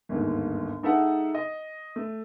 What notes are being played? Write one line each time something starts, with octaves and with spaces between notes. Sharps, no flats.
G1 D#2 G#2
G#3 D#4 A4 E5 F#5
D#5
A3